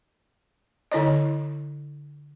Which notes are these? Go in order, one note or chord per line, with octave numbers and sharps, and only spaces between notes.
D3 E4 C#5 D#5